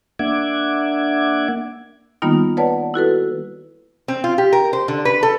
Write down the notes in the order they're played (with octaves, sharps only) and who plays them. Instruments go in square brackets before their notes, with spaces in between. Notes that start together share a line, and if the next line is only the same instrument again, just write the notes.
[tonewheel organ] A#3 D4 E5 F#5 D6 G#6
[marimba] D#3 G3 A#3 B3 D#4 F4
B4 C#5 D5 F#5 A5
E4 F#4 A4 B4
[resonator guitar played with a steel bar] C4
F4
G4
A#4
C5
D3
B4
A4